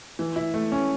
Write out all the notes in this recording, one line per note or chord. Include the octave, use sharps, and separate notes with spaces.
E3
E4
A3
C#4